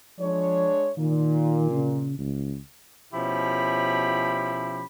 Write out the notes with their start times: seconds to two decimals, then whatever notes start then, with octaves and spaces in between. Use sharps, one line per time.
0.19 F3 G#3 D4 C#5
0.98 A#2 D#3
1.71 C#3
2.18 C#2
3.13 B2 F3 C#4 E4 G4 B5